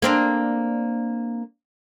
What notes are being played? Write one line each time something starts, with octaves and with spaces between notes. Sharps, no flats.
A#3 C4 D4